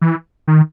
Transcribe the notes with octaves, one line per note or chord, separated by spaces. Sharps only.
E3
D#3